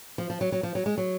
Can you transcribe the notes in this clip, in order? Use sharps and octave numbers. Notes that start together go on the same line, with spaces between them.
F3
F3
F#3
F#3
F3
F#3
G#3
F#3